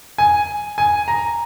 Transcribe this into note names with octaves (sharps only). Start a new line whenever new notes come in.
G#5
G#5
A#5